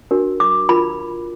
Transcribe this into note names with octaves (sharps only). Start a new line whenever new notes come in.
D4 F#4 A#4
D6
F4 A#4 B5